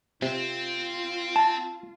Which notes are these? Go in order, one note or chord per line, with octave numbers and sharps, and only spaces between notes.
C3 C4 F4
A5